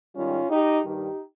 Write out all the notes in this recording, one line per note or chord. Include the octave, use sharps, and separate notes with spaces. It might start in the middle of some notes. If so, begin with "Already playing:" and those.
G#2 D#3 G3 C#4 F4
D#4 G4
G2 D#3 G3 D#4 G4